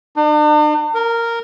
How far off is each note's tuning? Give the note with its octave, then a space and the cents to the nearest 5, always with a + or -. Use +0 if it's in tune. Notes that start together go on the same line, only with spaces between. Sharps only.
D4 +45
A#4 -10